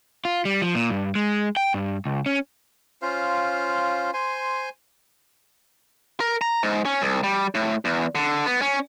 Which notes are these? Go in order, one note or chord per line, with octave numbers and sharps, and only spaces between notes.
F4
G3
F3
A#2
G2
G#3
G5
G2
C#2
C#4
C#4 F4 C5 F5
C5 G#5 C6
A#4
A#5
G#2
C#4
C2
G3
A2
E2
D3
B3
C#4